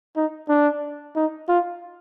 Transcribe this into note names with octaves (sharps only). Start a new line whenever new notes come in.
D#4
D4
D#4
F4